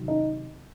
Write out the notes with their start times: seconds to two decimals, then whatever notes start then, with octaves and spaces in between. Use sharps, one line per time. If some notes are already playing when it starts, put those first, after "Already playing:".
Already playing: C3 D#3 F#3
0.08 D#4